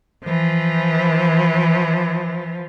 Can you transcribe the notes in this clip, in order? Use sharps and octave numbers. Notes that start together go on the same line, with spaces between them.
E3 F3